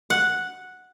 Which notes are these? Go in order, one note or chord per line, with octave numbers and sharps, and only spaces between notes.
F#5